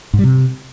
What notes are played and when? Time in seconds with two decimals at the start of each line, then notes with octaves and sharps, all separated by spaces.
0.13 G#2
0.19 G3
0.24 C3